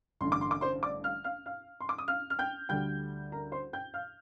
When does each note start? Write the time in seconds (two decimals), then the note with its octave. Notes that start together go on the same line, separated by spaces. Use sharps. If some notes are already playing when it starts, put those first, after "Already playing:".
0.21 A1 G2 D3 C6
0.32 D6
0.41 C6
0.51 D6
0.61 C5 C6
0.83 D5 D6
1.04 F5 F6
1.24 F5 F6
1.46 F5 F6
1.80 C6
1.89 D6
1.98 D#6
2.08 F5 F6
2.30 F6
2.39 G5 G6
2.69 D2 D3 G3 G5 G6
3.32 A#4 A#5
3.52 C5 C6
3.73 G5 G6
3.94 F5 F6